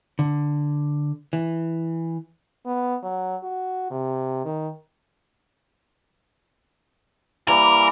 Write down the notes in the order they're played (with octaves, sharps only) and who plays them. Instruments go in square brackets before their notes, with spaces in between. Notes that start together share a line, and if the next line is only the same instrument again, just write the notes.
[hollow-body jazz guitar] D3
E3
[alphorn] B3
F#3
F#4
C3
D#3
[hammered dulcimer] E3 G3 A#3 [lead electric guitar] A#4